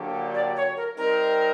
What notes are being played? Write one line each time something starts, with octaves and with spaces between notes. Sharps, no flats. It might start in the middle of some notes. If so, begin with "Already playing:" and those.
Already playing: D3 F#3 A#3 D4 G4
D5
C#5
A#4
G3 C4 D#4 A#4